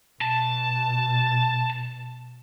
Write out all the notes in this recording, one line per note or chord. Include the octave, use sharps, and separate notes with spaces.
B2 A5